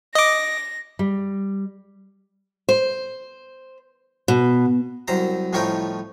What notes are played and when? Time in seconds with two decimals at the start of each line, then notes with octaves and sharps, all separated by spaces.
0.15 D#5 D6 A#6
0.99 G3
2.69 C5
4.28 B2
5.08 C2 F#2 C5 A#5
5.53 C2 A2 F3 C#4 D#4 G5